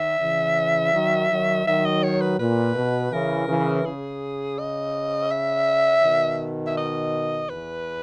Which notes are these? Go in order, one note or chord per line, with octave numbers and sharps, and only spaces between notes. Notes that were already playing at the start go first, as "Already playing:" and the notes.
Already playing: D#3 E5
C#3 E3
D#3 F#3
D#3 F#3
D#3 F#3 E5
D#5
C#5
B4
A#2 B4
B2
C#3 E3 A#4
C#3 E3
C#3 G#4
D#5
E5
B2 D#3
E5
D#5
E2 B4